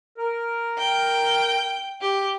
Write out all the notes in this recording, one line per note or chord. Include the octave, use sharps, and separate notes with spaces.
A#4
G5
G4